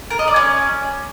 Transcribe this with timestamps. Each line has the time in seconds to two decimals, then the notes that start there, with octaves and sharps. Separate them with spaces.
0.10 A#4
0.19 D#5
0.28 D5
0.36 C#4